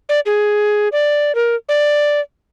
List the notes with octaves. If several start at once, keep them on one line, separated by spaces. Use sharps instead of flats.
D5
G#4
D5
A#4
D5